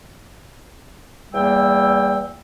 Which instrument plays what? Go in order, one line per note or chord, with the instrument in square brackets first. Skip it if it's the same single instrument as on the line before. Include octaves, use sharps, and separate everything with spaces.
[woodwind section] E2 G3 A#3 G5 E6